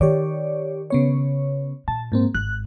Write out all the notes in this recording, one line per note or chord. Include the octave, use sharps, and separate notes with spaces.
D#3 G4 C#5 D5
C#3 B3 C#5
A#2 A5
G#2 A#3 C4
G#1 F#6